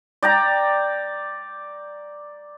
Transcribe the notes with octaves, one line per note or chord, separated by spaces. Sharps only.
D5 G5 A#5